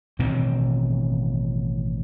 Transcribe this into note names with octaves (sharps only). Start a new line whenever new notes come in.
A1 B2 D#3 C4